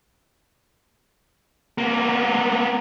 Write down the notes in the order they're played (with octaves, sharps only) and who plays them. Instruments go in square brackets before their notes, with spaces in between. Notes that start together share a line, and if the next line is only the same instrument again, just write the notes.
[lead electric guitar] A#3 B3